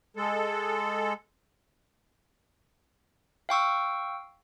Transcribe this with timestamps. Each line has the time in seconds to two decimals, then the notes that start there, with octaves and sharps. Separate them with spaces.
0.17 G#3 A4
3.49 F5 G5 C#6 E6